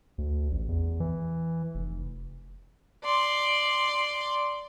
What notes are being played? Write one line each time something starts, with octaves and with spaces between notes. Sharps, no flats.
D2
A1
E2
E3
F1
D5 C6